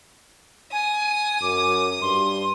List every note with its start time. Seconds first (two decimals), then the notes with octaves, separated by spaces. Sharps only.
0.72 G#5 D#6
1.42 F#2 D6
2.02 G2 C6